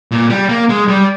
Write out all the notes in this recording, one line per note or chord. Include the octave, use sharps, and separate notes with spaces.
A#2
G3
A#3
G#3
G3